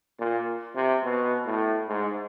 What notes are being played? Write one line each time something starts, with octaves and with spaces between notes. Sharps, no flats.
A#2
C3
B2
A2
G#2